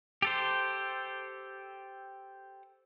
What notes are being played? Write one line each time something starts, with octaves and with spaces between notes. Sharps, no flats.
G4 A4 C5